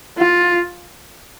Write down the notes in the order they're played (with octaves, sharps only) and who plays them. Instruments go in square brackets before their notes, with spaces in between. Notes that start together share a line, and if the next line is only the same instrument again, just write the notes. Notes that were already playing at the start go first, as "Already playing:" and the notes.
[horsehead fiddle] F4